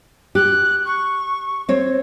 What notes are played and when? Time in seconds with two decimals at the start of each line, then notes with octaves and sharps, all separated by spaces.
0.35 G4 F#6
0.85 C#6
1.69 C4 C#5